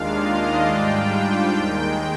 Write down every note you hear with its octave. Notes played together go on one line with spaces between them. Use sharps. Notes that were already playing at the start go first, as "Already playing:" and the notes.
Already playing: D#2 D#3 G#3 D4 F4 F5
D#5
G#2 G3 D4 F4 G5
D#2 D#3 G#3 G5